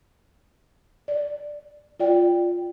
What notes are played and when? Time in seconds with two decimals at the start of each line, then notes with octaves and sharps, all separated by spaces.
1.08 D5
2.00 F4 D5 G5